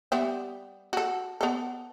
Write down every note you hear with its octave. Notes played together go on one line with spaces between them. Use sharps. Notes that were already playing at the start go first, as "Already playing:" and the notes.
G3 B3 E5
F#4 A4
B3 A4